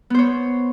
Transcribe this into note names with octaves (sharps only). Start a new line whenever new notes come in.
B3 C5 C#5